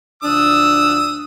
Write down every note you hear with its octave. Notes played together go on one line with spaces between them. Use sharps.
D2 F3 D4 D#6 E6